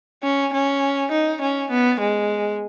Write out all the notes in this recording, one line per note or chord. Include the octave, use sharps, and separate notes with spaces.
C#4
C#4
D#4
C#4
B3
G#3